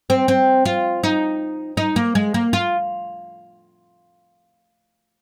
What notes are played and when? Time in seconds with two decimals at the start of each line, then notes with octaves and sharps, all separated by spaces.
0.10 C4
0.28 C4
0.65 F4
1.03 D#4
1.77 D#4
1.96 A#3
2.15 G#3
2.34 A#3
2.53 F4